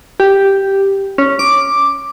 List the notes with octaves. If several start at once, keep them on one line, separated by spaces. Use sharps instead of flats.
G4
C#4
D6